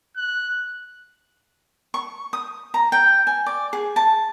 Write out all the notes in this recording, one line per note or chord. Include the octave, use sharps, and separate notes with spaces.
F#6
C#6
D#6
A#5
G5
G#5
D5
G#4
A5